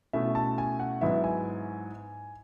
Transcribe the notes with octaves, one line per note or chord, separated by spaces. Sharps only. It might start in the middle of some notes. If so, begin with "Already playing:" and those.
B2 A3 C#4 E4 E5
A5
G#5
F#5
G#2 F#3 B3 E4 E5
G#5